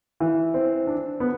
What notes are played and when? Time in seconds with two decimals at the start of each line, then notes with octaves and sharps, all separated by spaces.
0.20 E3
0.54 C4
0.87 D4
1.20 B3